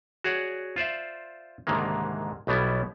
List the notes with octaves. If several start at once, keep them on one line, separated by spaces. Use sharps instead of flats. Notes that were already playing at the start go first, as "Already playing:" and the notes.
F#4 G#4 C#5 D5 F#5
F4 C5 D5 E5
C2 G#2 D3 D#3 G#3 A#3
B1 B2 G3 B3 E4